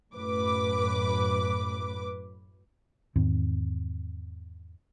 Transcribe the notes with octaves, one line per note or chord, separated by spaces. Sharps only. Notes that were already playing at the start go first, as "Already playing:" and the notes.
F#2 A2 B4 D6
E2 G#2 D#3 C4